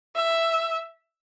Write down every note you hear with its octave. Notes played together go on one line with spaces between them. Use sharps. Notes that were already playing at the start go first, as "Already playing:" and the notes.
E5